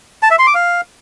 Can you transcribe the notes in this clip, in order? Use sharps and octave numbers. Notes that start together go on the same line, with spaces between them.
A5
E5
C6
D6
F5